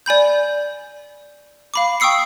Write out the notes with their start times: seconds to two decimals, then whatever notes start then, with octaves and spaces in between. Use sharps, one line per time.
0.06 D5 G#5 B5 G6
1.74 F5 B5 D6
2.00 G5 C#6 D#6 E6 C7 C#7